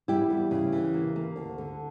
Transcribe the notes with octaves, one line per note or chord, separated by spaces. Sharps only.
G3 E4 G4
E2
C#3
E3
A#3
A#3
D2
D3